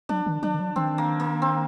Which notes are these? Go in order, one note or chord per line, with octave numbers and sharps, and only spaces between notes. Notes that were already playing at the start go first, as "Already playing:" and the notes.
F#3 D4
D#3
F#3 D4
D#3
F#3
D#3 C4
A#3
A#3
C4